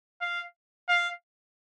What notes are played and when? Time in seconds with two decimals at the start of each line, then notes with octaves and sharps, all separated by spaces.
0.22 F5
0.89 F5